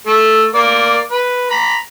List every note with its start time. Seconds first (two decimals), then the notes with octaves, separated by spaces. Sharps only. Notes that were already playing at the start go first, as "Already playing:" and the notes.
0.07 A3
0.54 A#3 D5
1.12 B4
1.51 A#5 B5